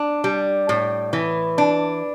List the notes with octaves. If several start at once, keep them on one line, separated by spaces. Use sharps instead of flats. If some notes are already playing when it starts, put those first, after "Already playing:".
Already playing: D4
G3
A2
E3
D4